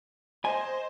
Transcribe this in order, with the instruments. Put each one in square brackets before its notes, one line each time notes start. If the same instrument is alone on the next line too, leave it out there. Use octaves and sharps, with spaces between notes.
[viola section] C5 [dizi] D#5 [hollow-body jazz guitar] G#5